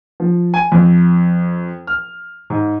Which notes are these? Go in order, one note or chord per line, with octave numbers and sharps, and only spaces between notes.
F3
G#5
F2
F6
G#2